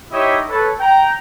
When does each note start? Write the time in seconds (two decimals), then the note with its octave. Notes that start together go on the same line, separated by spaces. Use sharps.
0.12 D#4 E4 G4 C#5 D#5 E5
0.49 A4 B4 C#5
0.80 G5 A#5